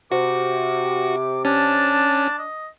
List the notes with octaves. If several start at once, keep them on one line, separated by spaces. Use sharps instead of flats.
C3 F#4 D6
C#4 D4 A5
D#5